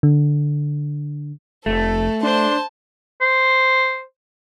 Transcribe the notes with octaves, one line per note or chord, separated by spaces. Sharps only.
D3
F1 A3 A4
D4 C5 A5 C6
C5